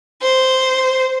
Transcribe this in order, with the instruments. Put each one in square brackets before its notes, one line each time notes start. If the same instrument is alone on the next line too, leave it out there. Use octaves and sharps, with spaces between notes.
[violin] C5